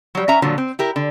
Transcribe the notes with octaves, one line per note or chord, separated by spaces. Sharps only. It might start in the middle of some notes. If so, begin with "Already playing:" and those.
F#3 G3
C#4 E5 A#5
A#2 D3 F3 F#3
C4
E4 G4 A#4
D3